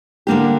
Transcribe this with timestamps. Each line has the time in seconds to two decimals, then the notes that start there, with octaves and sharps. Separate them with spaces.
0.27 D3 G3 A#3 D4 G4